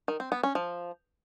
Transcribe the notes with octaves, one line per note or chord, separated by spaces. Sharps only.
D#3
C4
B3
C#4
F3